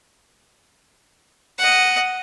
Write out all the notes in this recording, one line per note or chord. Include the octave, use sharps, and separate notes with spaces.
D#5 F#5